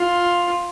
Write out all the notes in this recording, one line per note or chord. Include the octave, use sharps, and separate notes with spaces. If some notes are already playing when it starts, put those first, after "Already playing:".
Already playing: F4